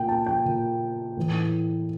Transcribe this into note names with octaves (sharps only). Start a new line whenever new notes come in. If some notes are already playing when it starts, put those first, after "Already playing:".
Already playing: A#2 G5
A5
G5
A#2
A2 E3